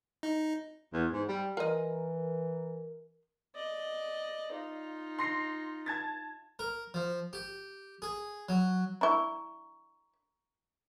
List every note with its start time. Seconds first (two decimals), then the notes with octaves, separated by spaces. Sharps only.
0.23 D#4
0.93 E2
1.13 G#2
1.28 G3
1.57 E3 F4 A#4 D#5
3.56 D5 D#5
4.53 D#4 F4
5.19 C6 A#6 C7
5.86 A5 G#6 A6
6.59 A#4
6.94 F3
7.33 G4
8.02 G#4
8.49 F#3
9.01 D4 E4 A#5 C#6